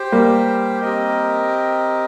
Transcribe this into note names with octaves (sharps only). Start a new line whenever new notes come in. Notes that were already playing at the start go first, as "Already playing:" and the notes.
Already playing: G4 C5 G5
G3 A#3
C4 G4 A#4 D#5 G5